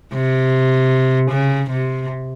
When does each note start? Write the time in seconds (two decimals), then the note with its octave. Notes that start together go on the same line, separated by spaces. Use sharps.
0.13 C3
1.31 C#3
1.71 C3